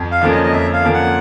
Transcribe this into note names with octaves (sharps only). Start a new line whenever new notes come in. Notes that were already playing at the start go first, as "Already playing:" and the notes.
Already playing: F2
F5
D3 F3 A#3 C#4
D#5
D#5
F2 E5
F5
D3 F3 A#3 C#4
F#5